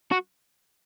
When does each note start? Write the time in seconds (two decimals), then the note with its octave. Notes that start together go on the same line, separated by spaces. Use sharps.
0.12 F#4